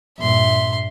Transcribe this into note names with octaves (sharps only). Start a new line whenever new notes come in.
G2 A#2 E5 C6